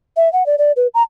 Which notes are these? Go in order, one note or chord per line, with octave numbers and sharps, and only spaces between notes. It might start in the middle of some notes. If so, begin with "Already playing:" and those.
E5
F#5
D5
D5
B4
A#5